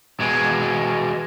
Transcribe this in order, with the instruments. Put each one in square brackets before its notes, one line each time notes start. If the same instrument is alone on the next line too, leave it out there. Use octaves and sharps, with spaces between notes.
[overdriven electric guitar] B2 G#3